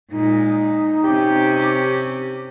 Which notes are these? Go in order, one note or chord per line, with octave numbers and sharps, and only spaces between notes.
A#2 G#3 D#4
C3 C#4 G4